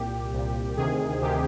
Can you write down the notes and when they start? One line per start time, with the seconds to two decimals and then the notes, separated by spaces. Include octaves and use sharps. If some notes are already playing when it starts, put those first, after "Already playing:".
Already playing: C2 A#2 G4
0.33 C2 A#2
0.77 D2 C3 D#3 G#4
1.21 D2 C3 D#3 G4